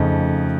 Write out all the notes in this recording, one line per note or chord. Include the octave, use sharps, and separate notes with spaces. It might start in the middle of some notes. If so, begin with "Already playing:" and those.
Already playing: F2 C#3 A3 D#4